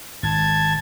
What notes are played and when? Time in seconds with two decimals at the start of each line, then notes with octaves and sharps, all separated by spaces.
0.23 G#1 A5 G#6